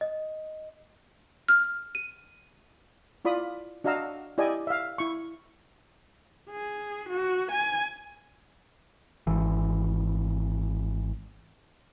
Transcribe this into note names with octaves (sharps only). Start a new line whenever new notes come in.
D#5
F6
D#7
E4 F4 D5 B5 D#6
D4 F#4 D#5 F5 A#5 E6
E4 G4 D5 D#5 G#5
E5 F5
E4 C#6
G#4
F#4
G#5
G#1 E3